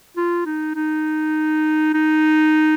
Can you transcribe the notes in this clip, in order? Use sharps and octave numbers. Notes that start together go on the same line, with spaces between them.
F4
D#4
D#4
D#4